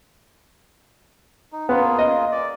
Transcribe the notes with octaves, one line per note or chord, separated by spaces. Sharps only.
D#4
A#3 B3 F4 G#4
D#5
D5